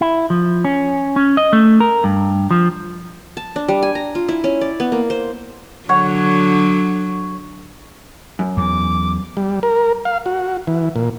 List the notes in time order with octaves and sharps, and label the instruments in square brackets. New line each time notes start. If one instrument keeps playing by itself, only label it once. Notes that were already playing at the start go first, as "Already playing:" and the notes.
[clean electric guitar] E4
F3
C#4
C#4
D#5
A3
A#4
G2
F3
[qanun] A5
D4
G3
G#5
A#5
F4
E4
C#4
D5
B3
A#3
C5
[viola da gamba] D3 F#3 [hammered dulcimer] C#5 F#5
[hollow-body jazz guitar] F#2
[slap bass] E2 [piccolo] D6
[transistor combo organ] G3
A#4
F5
F#4
E3
A#2